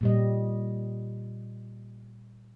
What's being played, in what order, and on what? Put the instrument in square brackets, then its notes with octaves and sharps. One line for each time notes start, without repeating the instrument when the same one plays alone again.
[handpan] A#2 G3 D#5